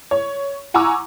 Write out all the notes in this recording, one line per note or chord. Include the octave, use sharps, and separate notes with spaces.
C#5
F#5 G#5 A#5 C#6 D6 E6